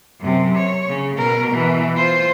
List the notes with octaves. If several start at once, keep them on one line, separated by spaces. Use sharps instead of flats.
F#2 C3
C#5
C#3
B2 A#4
B2 E3
F4 C5